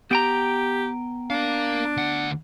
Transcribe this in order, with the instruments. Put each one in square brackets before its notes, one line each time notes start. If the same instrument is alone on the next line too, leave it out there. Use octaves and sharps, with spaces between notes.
[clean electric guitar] B3 G5 A#5 [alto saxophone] G4
[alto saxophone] D4 [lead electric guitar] A#4 F5
[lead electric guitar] D2 F#5